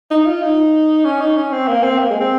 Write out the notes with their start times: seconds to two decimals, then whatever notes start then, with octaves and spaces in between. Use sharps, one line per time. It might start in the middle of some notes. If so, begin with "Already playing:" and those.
0.11 D#4
0.26 F4
0.42 D#4
1.05 C#4
1.21 D#4
1.37 C#4
1.52 C4
1.68 A#3
1.84 C4
1.99 A#3
2.10 G#3
2.20 C4